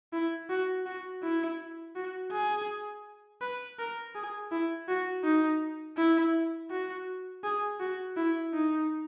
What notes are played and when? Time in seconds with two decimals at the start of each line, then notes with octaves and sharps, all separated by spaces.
0.13 E4
0.50 F#4
0.86 F#4
1.23 E4
1.95 F#4
2.32 G#4
3.41 B4
3.79 A#4
4.15 G#4
4.51 E4
4.88 F#4
5.24 D#4
5.97 E4
6.70 F#4
7.44 G#4
7.80 F#4
8.16 E4
8.54 D#4